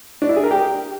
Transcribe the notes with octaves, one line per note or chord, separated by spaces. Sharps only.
D4
E4
G#4
A#4
G4